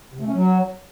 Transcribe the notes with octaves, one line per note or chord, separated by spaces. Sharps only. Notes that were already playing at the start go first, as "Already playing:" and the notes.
C3
A3
C#4
F#3